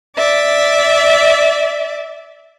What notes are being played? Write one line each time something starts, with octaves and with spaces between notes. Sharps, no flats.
D5 E5